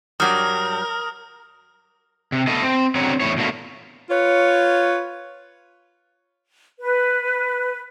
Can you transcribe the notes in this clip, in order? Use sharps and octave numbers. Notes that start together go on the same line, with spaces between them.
G2 F#3 G3 A#4 D#6 F6
C3
A3 B3 A4 D#5
C4
D3 F#3 C4 C#4 C#5 A#5
E2 A2 E4 C#5
B2 D3 A3 A#3
F4 B4 C#5
B4